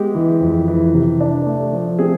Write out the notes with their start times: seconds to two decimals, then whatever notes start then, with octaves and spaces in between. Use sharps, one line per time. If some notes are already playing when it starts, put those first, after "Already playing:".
Already playing: G#3 B3 G4
0.15 E3
0.41 F2
0.68 E3
0.94 C3
1.21 D4
1.46 A3
1.73 F3
1.99 C4 G#4